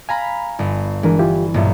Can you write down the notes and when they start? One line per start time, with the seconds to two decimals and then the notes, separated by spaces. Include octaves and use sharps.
0.09 F5 G#5 A#5 B5
0.59 G1
1.03 E3 G#3 D4 A#4
1.19 E4 F4 G4
1.54 B1 G2 A#2 E4